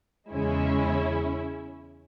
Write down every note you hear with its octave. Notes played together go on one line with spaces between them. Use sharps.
E2 C#3 G#3 C#4 E4